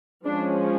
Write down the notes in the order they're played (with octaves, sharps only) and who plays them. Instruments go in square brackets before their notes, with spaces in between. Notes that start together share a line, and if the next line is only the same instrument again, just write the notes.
[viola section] F3 G#3 C#4 D4